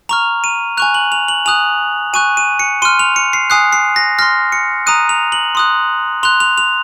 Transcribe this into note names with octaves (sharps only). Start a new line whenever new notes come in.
A#5 C#6 F6 F7
D#7
G#5 C#6 F#6 F7
F#7
F7
F#7
G#5 D#6 F#6 F7
G#5 C#6 F#6 D#7
D#7
C#7
C6 F6 D#7
F7
C#7
C7
G#5 D#6 F#6 C7
C7
A#6
C6 F6 A#6
C#7
A#5 D#6 F#6 D#7
F7
F#7
C6 D#6 F#6
C6 F#6 F7
F7
F7